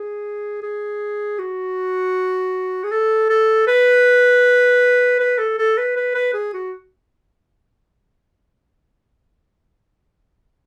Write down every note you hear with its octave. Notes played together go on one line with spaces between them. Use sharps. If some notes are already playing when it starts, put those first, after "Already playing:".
Already playing: G#4
G#4
F#4
G#4
A4
A4
B4
B4
A4
A4
B4
B4
B4
G#4
F#4